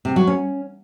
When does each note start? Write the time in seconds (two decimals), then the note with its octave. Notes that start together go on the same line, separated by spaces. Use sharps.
0.05 C3
0.16 F#3
0.27 C#4